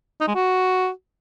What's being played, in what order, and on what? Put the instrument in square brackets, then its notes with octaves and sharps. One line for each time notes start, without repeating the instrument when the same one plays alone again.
[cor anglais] D#4
G#3
F#4